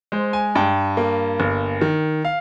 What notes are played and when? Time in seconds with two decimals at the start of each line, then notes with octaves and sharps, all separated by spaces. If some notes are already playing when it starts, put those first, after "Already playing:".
0.12 G#3 C5
0.33 G#5
0.55 G2 G5
0.97 A#3
1.40 G1
1.81 D#3
2.25 F5